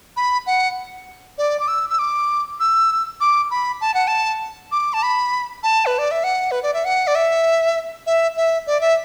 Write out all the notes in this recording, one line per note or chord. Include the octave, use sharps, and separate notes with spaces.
B5
F#5
D5
D6
E6
E6
D6
E6
D6
B5
A5
F#5
A5
D6
A5
B5
A5
B4
D5
E5
F#5
B4
D5
E5
F#5
D5
E5
E5
E5
D5
E5